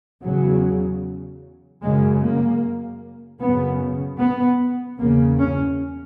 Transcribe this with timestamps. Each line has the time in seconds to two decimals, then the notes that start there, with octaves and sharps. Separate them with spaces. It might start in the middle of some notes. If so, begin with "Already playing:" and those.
0.24 E2 C#3 F#3
1.82 F#2 C#3 G#3
2.23 A#3
3.41 F#2 C#3 B3
4.20 B3
4.99 E2 C#3 A#3
5.39 C#4